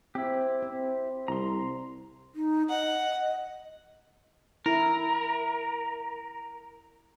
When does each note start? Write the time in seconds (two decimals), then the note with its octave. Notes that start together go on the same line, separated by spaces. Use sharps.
0.15 C4 E4 G4
0.62 C4
1.28 C2 A#5 C6
2.35 D#4
2.70 D#5 F#5
4.66 E4 A#4